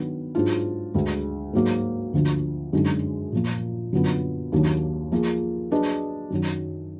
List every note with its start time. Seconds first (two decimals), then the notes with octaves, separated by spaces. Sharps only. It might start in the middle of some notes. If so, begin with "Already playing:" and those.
Already playing: D#3 F#3 B3 D4
0.35 G#2 F#3 D4 F4
0.94 D2 D3 G#3
1.53 G#2 F#3 A#3
2.14 D2 D3 F3
2.73 F#2 D3 G#3 D#4 G#4
3.32 A#2 F3 A#3
3.93 F#2 D3 F#3 B3 F4
4.52 D#2 D#3 F#3 A#3 D4
5.12 F3 A#3 F4 G#4
5.71 F#3 D4 G#4 B4 D#5
6.30 F#2 D#3 F#3